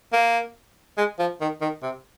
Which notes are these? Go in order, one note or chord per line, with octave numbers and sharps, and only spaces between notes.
A#3
G#3
F3
D#3
D#3
C3